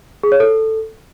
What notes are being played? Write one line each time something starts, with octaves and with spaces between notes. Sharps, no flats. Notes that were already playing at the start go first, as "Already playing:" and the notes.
G#4
C#5
A4